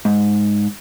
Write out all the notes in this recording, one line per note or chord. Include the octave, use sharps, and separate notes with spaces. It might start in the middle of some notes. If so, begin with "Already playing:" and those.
G#2